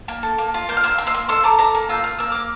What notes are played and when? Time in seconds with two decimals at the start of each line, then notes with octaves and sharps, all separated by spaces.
0.08 A#3
0.23 A4
0.38 A#3
0.54 F4
0.69 A#3 G6
0.77 F6
0.84 A#3 C6 E6
0.98 A#3
1.07 C6 E6
1.14 A#3
1.29 A4 C6 E6
1.44 A4 A#5 D6
1.59 A4 A#5 D6
1.74 A#3
1.89 F4 E6 G6
2.04 A#3 F6
2.19 A#3 E6
2.32 A#3 D6 F6